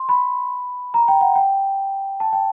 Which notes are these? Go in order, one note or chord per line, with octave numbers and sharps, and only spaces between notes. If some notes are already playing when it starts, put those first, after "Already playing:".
Already playing: C6
B5
A#5
G5
F#5
G5
A5
G5